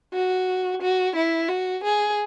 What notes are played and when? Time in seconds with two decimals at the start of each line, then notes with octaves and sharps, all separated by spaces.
0.13 F#4
0.81 F#4
1.15 E4
1.48 F#4
1.83 G#4